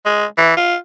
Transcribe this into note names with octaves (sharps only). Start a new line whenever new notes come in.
G#3
E3
F4